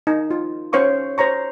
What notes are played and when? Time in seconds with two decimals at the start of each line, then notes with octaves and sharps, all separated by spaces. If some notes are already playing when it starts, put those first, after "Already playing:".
0.07 D#4
0.31 F4
0.73 C#4 C5 C#5 F5 C#6 D6
1.18 C5 C#5 A#5 C#6